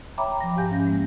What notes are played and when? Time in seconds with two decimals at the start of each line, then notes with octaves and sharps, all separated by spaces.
0.18 C#5 E5 G5 A#5 B5 D6
0.41 F3 A#6
0.57 G#2 G4 F5 G#5 G6
0.71 C#4 A#6
0.87 G#3 A#3